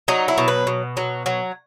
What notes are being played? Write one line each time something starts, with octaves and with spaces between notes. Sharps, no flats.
F#3 D#4
E4
B2
B4
B2
F#3
F#3